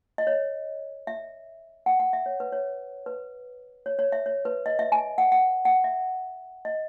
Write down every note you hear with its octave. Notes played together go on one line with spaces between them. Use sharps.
D#5
C#5
E5
F#5
F#5
E5
C#5
B4
C#5
B4
C#5
C#5
E5
C#5
B4
D#5
E5
G#5
F#5
F#5
F#5
E5
D#5